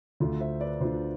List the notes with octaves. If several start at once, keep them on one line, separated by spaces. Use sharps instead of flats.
D2 D3 A3 D4 F4
C5 E5
B4 D5
D2 D3 A3 D4 F4 C5